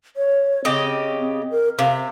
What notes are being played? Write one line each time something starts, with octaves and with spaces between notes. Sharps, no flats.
C#5
C#3 C4 G4 D#5
A#4
C3 F5